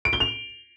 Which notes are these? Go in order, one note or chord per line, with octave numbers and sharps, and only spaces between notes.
D7
G7
F7